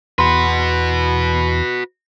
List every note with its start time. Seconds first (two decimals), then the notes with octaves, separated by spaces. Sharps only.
0.19 E2 F#4 B4 B5 C6